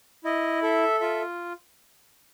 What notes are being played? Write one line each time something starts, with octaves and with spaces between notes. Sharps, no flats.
E4 D#5
A4 E5
F4 E5